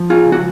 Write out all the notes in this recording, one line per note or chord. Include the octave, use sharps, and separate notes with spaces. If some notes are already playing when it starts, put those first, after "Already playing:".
Already playing: F3
F4 G#4
C#2
F#4